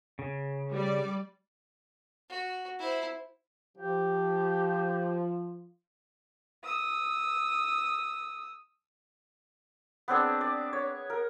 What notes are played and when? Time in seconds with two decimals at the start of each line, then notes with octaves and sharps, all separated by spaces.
0.19 C#3
0.73 G3 D5
2.29 F#4
2.79 E4 C5
3.77 F3 G4
6.63 D#6 E6
10.08 B3 C4 D4 G#4
10.41 D5
10.73 C#5
11.10 A#4